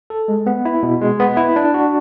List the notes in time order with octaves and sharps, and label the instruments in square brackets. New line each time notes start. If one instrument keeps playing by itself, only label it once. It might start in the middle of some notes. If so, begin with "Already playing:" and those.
[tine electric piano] A4
G#3
B3
E4
B2
G#3
B3
E4
D4
F#4